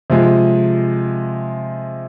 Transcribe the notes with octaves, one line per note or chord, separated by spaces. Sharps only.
C3 F3 G#3